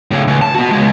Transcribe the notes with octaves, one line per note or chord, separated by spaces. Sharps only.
A2 C#3
C#2
A5
B3 F#4
C#3 G#3